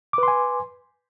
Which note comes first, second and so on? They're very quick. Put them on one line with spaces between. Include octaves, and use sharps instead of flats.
D6 B4 C6 G#5